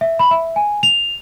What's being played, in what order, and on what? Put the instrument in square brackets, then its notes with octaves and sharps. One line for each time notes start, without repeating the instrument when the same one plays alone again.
[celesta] E5
B5
E5
G#5
F7